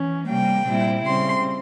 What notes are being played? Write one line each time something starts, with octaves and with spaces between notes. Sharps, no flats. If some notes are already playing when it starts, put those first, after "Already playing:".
Already playing: E3 C#4
C3 G3 A#3 G5
A#2 G3 C4 E4
C#3 G3 C4 C6